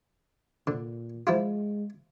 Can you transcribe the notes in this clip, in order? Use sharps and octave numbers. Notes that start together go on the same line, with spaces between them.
A#2 D3
F3 G#3 E4 F4